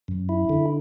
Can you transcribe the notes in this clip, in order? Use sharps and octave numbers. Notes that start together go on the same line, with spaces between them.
F#2
E4
D3